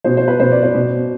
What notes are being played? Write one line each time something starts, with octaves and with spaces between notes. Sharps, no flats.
B2 C5
C5
B4
B2 C5
D5
C5
B2